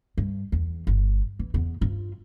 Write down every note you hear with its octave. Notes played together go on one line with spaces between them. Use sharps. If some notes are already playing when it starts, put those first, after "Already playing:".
G2
E2
G1
E3
E2 B3
G2 F4